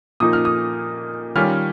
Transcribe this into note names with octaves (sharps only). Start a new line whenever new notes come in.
A#2 F3 A#3 D#4 D#6
F6
D#6
D#3 G3 C#4 F4 F6